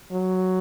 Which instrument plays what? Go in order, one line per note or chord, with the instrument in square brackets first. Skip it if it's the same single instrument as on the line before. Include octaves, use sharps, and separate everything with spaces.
[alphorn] F#3